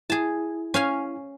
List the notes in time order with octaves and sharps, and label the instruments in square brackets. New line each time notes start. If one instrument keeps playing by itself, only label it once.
[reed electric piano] E4 [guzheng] G#4 A5
[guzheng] C#4 F5 G#5